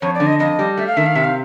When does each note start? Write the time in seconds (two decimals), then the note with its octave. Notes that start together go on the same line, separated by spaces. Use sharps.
0.01 F2 C#5
0.15 D5
0.20 D3
0.27 D#5
0.39 F2 D#5
0.59 G3
0.77 A3 E5
0.87 F5
0.97 D#3 E5
1.06 F5
1.15 C3 E5
1.24 F5